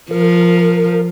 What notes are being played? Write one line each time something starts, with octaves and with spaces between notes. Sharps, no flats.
F3 A#4